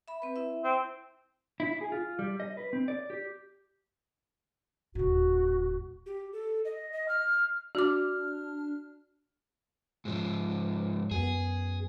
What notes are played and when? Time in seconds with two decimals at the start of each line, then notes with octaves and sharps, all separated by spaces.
0.08 E5 B5
0.22 C4 B4
0.36 E4 E5
0.64 C4
1.60 E4
1.81 G#4
1.92 F4
2.19 G3
2.40 D#5
2.57 B4
2.73 C4
2.88 D5
3.10 G4
4.95 D#1 A2 F#4
6.06 G4
6.33 A4
6.65 D#5
6.93 D#5
7.08 F6
7.75 D4 F#4 D6 F6
10.05 G#2 F3
11.11 F#2 B3 G#4